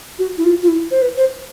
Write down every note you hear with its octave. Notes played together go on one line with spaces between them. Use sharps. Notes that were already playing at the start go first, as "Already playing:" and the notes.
F#4
E4
F4
F4
E4
C5
B4
C5